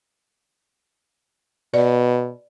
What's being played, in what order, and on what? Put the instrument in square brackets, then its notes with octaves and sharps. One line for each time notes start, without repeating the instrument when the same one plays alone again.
[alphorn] B2 [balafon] D5